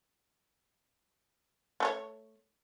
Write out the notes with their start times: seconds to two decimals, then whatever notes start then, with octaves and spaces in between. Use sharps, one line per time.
1.80 A3 A4 C#5